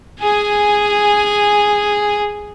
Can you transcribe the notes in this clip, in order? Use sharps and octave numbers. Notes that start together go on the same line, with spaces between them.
G#4 G#5